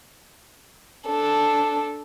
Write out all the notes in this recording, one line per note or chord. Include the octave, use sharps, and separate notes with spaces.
D4 A4